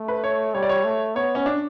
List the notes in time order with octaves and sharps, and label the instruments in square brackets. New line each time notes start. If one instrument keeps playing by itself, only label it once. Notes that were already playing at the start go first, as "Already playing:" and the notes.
Already playing: [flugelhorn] A3
[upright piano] B4
C#5
[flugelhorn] G3 [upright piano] C#5
[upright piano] D5
C#5
[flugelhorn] A3
[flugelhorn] B3 [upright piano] C#5
[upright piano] C#4
D4